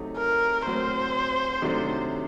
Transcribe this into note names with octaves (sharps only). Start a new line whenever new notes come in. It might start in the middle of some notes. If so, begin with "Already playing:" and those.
Already playing: C3 F#3 A3 D#4
A#4
A2 F#3 C4 C5
C3 D#3 F#3 A3 D4